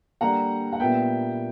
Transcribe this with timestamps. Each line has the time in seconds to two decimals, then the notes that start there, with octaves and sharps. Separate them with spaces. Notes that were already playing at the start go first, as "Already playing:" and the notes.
0.21 D3 G3 A#3 D4 F#5 A#5
0.73 F#5
0.80 A#2 G3 B3 E5 G5